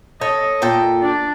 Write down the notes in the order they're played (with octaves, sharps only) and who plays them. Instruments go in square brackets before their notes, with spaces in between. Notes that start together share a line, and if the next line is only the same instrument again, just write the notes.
[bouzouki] A4 C#5 [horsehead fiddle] D#5
[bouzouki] A#2 A4 G5
[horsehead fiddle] D4 D5